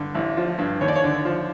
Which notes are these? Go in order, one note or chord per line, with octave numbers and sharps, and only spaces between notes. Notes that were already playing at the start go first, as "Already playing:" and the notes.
Already playing: G2 D3
A1
F3
G2
D#2 C#5
D5
C#5
D3
F3